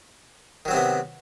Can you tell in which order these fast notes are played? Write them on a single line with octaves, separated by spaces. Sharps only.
D#3 F#3 C4 C3 B3